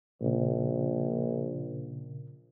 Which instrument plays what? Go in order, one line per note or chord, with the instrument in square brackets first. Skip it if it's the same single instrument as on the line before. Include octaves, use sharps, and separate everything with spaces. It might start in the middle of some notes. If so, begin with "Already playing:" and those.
[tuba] A#1 [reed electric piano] A#2 C#3